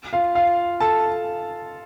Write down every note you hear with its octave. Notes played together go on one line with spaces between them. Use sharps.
F4 F5
F4 F5
A4 A5